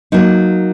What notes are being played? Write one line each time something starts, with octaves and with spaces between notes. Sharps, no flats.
F#3 A#3 D#4